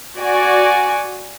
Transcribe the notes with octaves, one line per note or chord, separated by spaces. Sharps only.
F#4 D5 G#5